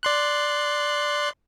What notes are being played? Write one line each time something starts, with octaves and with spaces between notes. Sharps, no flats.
D5 C6 F#6